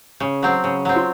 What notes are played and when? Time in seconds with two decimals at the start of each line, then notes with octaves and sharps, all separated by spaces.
0.20 C#3
0.43 F#3 C4
0.64 C#3
0.85 F#3 C4
0.96 F4